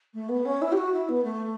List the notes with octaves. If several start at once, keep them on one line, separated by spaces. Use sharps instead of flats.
A3
B3
C#4
E4
G4
F#4
E4
B3
A3